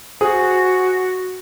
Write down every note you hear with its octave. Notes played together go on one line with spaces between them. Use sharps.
F#4 G#4 C5 D#6